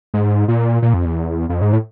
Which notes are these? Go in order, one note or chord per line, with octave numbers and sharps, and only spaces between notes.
G#2
A#2
A#2
F2
E2
F2
G#2
A2